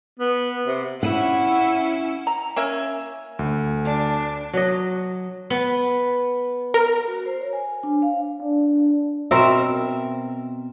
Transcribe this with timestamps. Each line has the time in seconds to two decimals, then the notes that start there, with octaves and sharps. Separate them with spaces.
0.20 B3
0.67 C3
1.03 C#4 E4 F#5
2.27 A#5
2.56 A#3 C#4 E5
3.39 D2
3.85 D4
4.53 F#3 D#5
5.50 B3
6.74 A#4
7.08 F#4
7.26 C5
7.41 C#5
7.53 G#5
7.83 D4
8.02 F5
8.42 D4
9.31 B2 C4 A#4 E5